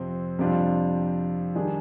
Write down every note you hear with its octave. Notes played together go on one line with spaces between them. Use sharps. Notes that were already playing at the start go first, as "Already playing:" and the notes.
Already playing: F2 C3 F3 C4
F2 C3 G3 D4 F4
D#3 G3 D4 G#4